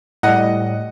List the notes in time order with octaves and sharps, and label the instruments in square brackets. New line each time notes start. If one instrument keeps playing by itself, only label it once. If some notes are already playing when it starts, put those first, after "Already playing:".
[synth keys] A2 G3 [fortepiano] D#5 F#5